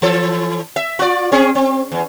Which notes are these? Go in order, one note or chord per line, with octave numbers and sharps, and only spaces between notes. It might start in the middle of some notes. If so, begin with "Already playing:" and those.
E3 A4
E5
F4 D5
C4 C#4 G#4
C4
E2